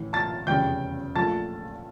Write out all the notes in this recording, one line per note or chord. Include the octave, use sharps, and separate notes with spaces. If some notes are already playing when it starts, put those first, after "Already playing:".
Already playing: A1 A2 E3
A5 A6
F1 E2 C#3 G3 G5 G6
A#1 A#2 A3 A5 A6